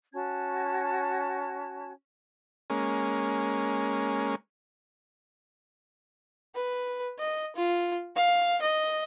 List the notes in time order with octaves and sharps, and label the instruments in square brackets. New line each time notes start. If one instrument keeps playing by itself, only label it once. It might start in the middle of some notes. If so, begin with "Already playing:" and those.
[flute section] C#4 F#4 A5 G#6
[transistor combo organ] G#3 A#3 C#4
[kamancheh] B4
D#5
F4
F5
D#5